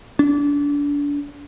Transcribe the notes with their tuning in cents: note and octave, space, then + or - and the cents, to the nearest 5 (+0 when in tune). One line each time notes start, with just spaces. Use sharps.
D4 -30